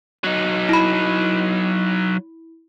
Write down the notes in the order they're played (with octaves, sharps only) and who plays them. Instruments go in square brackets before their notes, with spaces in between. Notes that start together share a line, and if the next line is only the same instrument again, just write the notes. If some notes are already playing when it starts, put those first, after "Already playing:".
[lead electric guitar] F#3 D#4
[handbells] E4 B5